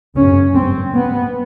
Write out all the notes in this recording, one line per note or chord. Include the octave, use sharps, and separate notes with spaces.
F#2 C#3 C#4
G2 C4
G2 B3